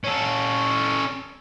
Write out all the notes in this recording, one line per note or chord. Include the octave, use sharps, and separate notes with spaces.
C#4 A4